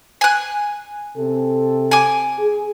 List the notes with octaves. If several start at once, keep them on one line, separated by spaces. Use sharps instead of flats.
G#5 F#6
C3 C4 A4
G#5 D6
G#4